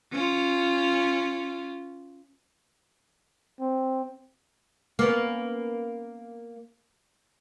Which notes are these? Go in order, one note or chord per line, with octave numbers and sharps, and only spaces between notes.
C#4 F4
C4
A#3 B3 C#4